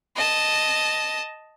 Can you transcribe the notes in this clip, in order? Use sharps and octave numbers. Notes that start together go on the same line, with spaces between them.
D#5 A5